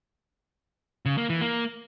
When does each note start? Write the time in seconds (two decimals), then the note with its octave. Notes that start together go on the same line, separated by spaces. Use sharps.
1.05 C#3
1.17 A#3
1.29 E3
1.41 A#3